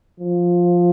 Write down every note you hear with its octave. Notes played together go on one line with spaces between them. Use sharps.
F3